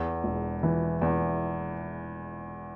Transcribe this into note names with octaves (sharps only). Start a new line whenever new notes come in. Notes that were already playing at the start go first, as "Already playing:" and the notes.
Already playing: E2
E1
E3
E2